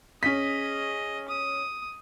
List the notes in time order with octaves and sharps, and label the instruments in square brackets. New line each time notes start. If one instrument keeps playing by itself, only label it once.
[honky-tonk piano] C#4 B6 [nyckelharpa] G#4 D#5
[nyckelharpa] D#6